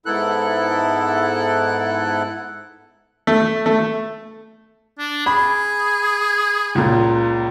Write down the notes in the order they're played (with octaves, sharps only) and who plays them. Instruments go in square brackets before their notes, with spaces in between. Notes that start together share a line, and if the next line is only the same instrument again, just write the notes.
[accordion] G#2 B3 E4 A4 F#6
[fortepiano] A3
A3
[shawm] D4
[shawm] G#4 [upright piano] B5
[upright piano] C#2 A#2